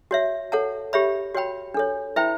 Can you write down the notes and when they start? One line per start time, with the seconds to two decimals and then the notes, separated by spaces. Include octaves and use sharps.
0.11 F#4 C#5 E5
0.52 A4 C#5 F#5 A5
0.93 G4 C#5 E5 B5
1.35 F#4 C#5 G5 B5
1.74 D4 A4 C#5
2.16 E4 B4 E5 G5 B5